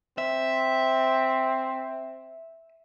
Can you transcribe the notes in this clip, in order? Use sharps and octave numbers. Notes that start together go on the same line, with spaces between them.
C4 E5